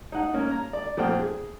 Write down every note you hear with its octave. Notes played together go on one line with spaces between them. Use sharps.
D#4 F#5
A#3 C#4
A#5
D5
F2 A#2 C5 F#5 G5 F6
G#4